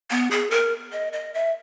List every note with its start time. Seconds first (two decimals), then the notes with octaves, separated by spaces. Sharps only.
0.11 B3
0.31 G#4
0.51 A#4
0.92 D#5
1.13 D#5
1.34 E5